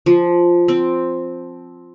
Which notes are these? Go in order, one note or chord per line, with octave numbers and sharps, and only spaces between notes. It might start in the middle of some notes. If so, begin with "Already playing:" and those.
F3
C4